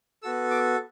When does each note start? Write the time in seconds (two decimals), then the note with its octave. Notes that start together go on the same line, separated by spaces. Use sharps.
0.23 B3 F#4 A4 E6
0.51 D6